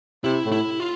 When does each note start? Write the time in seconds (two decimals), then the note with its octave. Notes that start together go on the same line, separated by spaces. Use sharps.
0.24 C3 E4
0.45 A2
0.52 E4
0.80 F4